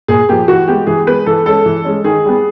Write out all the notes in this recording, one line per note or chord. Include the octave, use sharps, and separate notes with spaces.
A#2 G#4
F3 A#3 G4
E3 F#4
G#3 B3 G4
E3 G#4
G#3 B3 B4
E3 A4
G#3 C#4 A4
E3
G#3 C#4
D#3 G#4
G3 B3